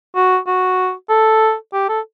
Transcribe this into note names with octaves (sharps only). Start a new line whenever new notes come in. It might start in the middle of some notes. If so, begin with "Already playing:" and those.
F#4
F#4
A4
G4
A4